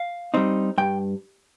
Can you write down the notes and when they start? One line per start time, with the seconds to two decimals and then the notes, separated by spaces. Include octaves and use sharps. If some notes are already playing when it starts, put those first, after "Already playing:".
Already playing: F5
0.34 G3 C4 D#4
0.78 G2 G5